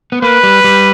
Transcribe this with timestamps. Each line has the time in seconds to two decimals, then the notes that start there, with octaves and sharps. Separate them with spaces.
0.12 B3
0.22 A#3 B4
0.43 G3
0.64 G3